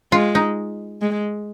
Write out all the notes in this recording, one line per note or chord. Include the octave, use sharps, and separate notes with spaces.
G#3 F4
D#4
G#3